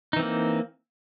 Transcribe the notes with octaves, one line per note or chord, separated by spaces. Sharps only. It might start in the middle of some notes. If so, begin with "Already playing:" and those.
E3 A#3 C4 D#4